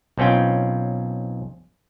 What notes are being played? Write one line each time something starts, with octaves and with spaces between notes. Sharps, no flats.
B1 C4 C#4 F4 G5